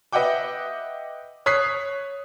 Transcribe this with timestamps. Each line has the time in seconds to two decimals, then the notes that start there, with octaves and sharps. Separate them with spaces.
0.13 B4 D#5 E5 F#5 G5 D6
1.46 C#5 D#6 F#6 B6 C7